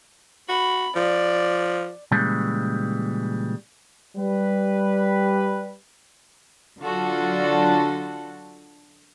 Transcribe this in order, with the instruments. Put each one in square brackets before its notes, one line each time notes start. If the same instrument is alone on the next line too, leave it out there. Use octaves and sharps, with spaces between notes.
[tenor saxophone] F#4 [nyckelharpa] B5
[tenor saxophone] F3 [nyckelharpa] D5
[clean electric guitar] A#2 C#3 E3 G3 G#3
[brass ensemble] G3 B4
[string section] D3 F#3 D4 F4 F#4 A4